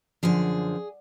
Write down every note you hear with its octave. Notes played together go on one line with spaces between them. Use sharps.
F#2 D3 F3 G#4